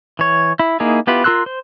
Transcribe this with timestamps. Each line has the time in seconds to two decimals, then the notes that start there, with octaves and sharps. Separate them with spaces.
0.19 E3 C#5
0.60 E4
0.80 A#3 D#4 E4 G#4
1.07 B3 E4 F4 G4 B4
1.24 F4 A#4 C6 E6 F#6
1.46 C5